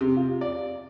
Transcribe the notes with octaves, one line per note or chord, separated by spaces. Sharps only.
C3
F4
D5